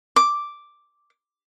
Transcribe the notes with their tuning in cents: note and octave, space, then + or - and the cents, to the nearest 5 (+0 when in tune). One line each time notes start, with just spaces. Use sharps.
D6 +0